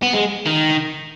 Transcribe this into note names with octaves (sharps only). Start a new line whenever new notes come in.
B3
G#3
D#3